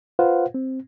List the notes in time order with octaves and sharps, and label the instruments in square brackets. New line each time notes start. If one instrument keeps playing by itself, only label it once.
[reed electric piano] F4 B4 C5 F5 F#5
C4